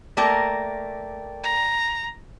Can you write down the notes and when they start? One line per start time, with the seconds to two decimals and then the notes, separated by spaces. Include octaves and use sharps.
0.17 A3 A#3 A#4 D5 G5 A6
1.43 A#5